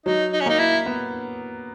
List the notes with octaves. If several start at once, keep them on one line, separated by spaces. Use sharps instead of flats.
F#3 D#4
D#4
C#4
A#3 D#4
E4
B3